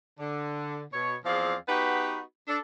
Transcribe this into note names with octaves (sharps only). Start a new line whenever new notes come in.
D3
B2 C#5
E2 F3 C4 G#4 D5 F5
B3 D#4 F#4 G4 B4
D4 A4